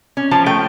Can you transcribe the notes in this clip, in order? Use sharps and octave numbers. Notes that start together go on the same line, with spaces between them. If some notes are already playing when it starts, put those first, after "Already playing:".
C#4
F3 A5
A3 G5